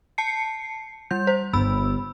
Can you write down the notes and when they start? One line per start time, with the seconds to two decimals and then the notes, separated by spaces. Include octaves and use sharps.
0.18 A5 C7 C#7
1.11 G3 G6
1.27 C5
1.53 G1 B5 E6